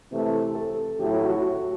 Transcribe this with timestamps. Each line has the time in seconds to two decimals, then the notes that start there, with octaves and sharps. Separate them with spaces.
0.11 C3 E3 A3
0.55 A4
0.99 A2 F#3 A3 E4 G4
1.14 F#4
1.29 F#4